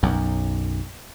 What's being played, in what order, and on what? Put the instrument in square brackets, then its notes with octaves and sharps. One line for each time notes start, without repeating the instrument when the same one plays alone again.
[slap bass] B1 F#2